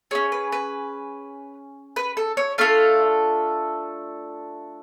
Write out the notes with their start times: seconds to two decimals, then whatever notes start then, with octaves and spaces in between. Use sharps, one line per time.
0.11 C#4 G#4 C#5
0.32 B4
0.52 B4
1.96 B4
2.17 A4
2.37 C#5
2.58 A3 D4 F4 A4 F5